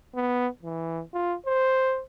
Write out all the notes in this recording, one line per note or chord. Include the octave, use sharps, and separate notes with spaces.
B3
E3
F4
C5